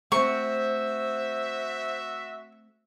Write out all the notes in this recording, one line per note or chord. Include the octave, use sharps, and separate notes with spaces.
A3 C4 F#4 C5 E5 C#6